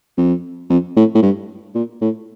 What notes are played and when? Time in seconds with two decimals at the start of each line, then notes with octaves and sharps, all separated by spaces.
0.18 F2
0.70 F2
0.96 A2
1.15 A2
1.23 G2
1.75 A#2
2.01 A2